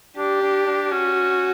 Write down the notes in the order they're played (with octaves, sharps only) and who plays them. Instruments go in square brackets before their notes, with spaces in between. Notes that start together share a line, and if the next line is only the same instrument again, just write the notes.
[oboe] D4 [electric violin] G4
[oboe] D4
D4
[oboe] C#4 [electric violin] F#4